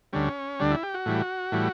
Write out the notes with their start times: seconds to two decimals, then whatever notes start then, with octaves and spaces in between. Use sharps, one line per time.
0.13 D2 D3 G3 C#4
0.60 D2 D3 G3 D4
0.71 E4
0.83 G4
0.94 F#4
1.06 A2 E3 G3
1.52 A2 E3 G3